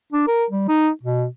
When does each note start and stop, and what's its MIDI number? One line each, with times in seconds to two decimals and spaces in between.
0.13 0.25 62
0.27 0.45 70
0.50 0.66 55
0.68 0.90 63
1.03 1.26 47